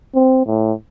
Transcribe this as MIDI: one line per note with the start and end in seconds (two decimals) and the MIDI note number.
0.14 0.46 60
0.46 0.72 45